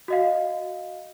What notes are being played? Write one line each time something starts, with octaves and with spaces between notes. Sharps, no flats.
F#4 D#5 F5